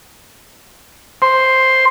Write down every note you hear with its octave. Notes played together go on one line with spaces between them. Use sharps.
C5